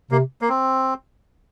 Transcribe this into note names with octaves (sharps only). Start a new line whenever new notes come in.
C3 A#3
A#3
C4